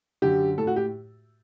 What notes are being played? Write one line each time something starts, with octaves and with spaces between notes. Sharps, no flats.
F#2 D3 G4
A2 A4
F#4
G4